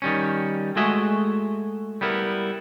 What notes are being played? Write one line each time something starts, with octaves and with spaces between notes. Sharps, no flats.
D#3 G3 C#4
G#3 A3 F#4 D#5 E5 G#5
G3 B3 E4 A#4